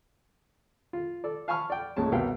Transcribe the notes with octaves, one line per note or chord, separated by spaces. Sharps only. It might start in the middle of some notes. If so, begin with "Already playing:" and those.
F4
A4 D5
F5 G#5 A5 B5 C#6 F6
D5 G5
A1 A#2 G#3 C#4 A5
C2 B2 B3 A#4 F5 G5